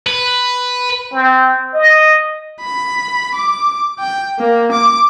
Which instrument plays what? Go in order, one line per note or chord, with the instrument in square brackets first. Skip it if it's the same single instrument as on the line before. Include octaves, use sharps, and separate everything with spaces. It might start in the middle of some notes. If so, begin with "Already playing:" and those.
[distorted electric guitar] B4
[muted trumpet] C4
D#5
[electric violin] B5
D6
G5
A#3
D6